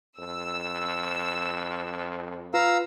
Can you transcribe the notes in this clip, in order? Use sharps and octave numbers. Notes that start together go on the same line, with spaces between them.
F2 E6
F4 B4 F5 A#5 E6